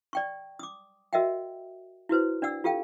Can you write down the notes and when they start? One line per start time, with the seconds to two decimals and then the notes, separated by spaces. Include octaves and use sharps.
0.13 D5 G5 C#6
0.59 D6 D#6
1.13 F#4 A#4 D#5 E5 F#5 G5
2.09 E4 F#4 B4 C5
2.42 D4 D5 F#5 E6
2.64 F4 G4 A4 F5 G5